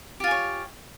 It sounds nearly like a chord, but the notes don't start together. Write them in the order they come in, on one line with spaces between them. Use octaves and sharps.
G4 F4 G#5 C#5